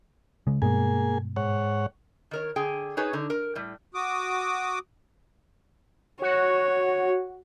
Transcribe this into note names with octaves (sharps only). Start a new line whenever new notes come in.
C#3 G#3
G2 B2 G#3 A#3 G#4 G#5
G#2 C#5 F#5
D#3 A#4 C#5
D3 G#4 G5
D#4 F#4 G#4 B4 C#5
D3 D#4
A#4
A2 G3
F#4 D6 D#6
F#4 C#5